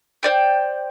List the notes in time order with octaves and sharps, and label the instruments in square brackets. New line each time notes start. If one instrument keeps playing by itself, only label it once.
[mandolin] C5 D5 G5